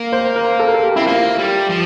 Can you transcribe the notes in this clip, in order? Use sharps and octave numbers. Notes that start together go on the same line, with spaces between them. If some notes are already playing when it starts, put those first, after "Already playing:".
Already playing: A#3
C5
A#4
A4
A#4
A4
G4
C4 E4
A#3 F4
G3
F3